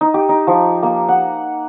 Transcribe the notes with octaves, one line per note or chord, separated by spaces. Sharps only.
D#4
G4
D#4
F3
A#3
F#5